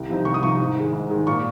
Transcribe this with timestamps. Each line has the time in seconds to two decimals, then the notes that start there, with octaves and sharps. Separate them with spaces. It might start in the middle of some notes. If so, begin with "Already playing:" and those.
Already playing: C2
0.09 C3 F3 C4 D#4
0.25 C2 C#6
0.34 D#6
0.42 C3 F3 C4 D#4 C#6
0.59 G#2
0.76 D#3 G#3
0.93 G#2
1.10 D#3 G#3
1.27 A#2 C#6